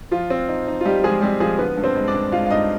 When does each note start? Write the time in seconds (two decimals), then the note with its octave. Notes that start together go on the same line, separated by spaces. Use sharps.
0.11 F3 F4
0.30 C4
0.48 D#4
0.67 D#4
0.81 F4
0.85 G3 D#4 G4
1.04 F3 G#3 G#4
1.22 G3 C4 G4
1.40 F3 G#3 G#4
1.58 D3 B3 B4
1.77 G2
1.84 C4 C5
1.96 G#3
2.08 D4 D5
2.14 G2
2.32 G#3 F4 F5
2.46 F5
2.51 G2 D#4 D#5